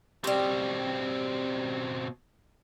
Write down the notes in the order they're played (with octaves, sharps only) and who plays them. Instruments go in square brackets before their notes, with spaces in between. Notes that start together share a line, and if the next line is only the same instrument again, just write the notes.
[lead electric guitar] B2 C4 [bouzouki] G3 G4